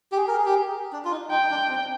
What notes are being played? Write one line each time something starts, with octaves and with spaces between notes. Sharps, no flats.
G4
G#4
A#4
G#4
G4
D4
F4
D#4
D#4 G5
D4
C4